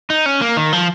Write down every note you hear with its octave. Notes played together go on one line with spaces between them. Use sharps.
D#4
C#4
A#3
D#3
F3